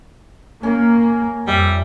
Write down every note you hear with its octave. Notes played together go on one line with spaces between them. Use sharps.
A#3 C#4 A#4
F2 G3 E5